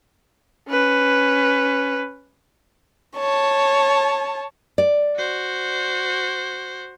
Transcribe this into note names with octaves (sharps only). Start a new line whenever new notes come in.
C#4 B4
C#5 A5
D5
F#4 C5